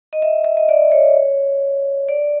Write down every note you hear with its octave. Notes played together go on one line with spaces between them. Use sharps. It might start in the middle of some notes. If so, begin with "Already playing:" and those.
D#5
E5
E5
D#5
D5
C#5
D5